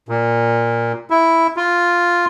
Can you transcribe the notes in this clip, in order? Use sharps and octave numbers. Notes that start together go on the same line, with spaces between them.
A#2
E4
F4